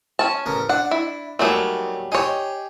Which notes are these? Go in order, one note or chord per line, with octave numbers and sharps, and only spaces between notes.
C#4 A5
A1 C#3 A#4
D4 F#5
E4
D#2 F#3 G3 A3 G#4 D6
D#4 G4 G#4 C#5